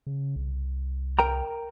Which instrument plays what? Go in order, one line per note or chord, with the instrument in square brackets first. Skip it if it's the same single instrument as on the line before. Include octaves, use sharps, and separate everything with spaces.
[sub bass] C#3
C2
[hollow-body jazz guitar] A#4 G5 A#5